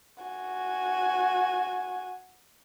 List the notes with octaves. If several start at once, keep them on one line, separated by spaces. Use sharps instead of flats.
F#4 G#5